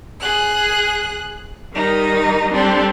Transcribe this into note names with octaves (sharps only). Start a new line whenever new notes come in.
G#4 F#6
D#3 G3 D#4
G3 C4 D4 A4